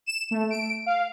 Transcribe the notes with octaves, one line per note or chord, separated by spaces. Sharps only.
E7
A3
D7
F5